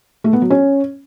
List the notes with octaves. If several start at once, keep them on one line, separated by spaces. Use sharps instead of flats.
A3
B3
F#3
C#4